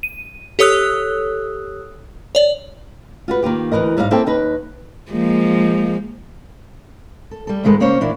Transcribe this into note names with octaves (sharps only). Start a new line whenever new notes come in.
D#7
G4 A4 C#5 D#6 E6 F#6
C#5 D5
F4 F#4 B4
D#3 A#3 F4 G4
D2 G#2 E3 A#4 D#5
G#2 G3 D#4 D5 F5
A#3 C4 E4 A4 C5 G5
D#2 D#4 B4
F3 G#3 A#3
A4
G3 A4
E2 G#2 D#3 G#3 A4 B4
C#3 A#3 C#4 C5 C#5
A#2 E3 A#3 D4 E4